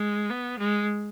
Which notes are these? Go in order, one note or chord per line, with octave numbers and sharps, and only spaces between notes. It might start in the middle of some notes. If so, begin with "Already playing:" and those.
Already playing: G#3
B3
G#3